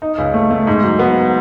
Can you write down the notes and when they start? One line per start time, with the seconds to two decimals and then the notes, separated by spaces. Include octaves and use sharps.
0.02 D#4
0.18 C#2
0.34 A3
0.51 A3
0.67 G#2
0.84 F#3
0.99 B3